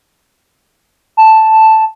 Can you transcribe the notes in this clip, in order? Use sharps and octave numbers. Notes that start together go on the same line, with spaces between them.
A5